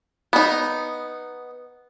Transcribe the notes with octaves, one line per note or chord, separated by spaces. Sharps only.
B3 D#4